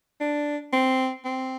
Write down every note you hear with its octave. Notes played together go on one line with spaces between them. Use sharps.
D4
C4
C4